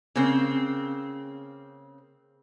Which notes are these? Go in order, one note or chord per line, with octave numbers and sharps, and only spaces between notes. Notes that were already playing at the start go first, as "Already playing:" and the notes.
C#3 A#3 C4